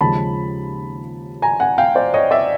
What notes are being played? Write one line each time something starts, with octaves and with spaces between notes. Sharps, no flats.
D#2 C#3 F3 G#3 A5 B5
G#5 A#5
F#5 G#5
F5 G5
C5 D5
C#5 D#5
D5 E5